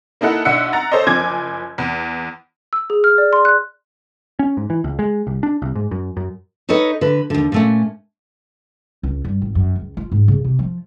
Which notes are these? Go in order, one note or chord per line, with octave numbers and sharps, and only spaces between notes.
A#3 D#4 E4 A4 F#5
B1 D4 E5 F#5 E6 C#7
F#5 A#5 A6
A4 C5 C#5 D#5
F#1 F3 G#5 D6 G#6
E2
E6
G#4
F6
D5
C6
F#6
C#4
G#2
E3
C#2
G#3
C2
D4
C2
G#2
F#2
F#2
D#4 A4 B4 C#5 D#5
D3 B4
D#2 D3
A#2 A3 C#4
C#2
G2
G#1
F#2
C#2
F4
G#2
C#3
C3
F3